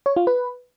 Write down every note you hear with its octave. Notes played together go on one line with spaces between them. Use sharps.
C#5
F4
B4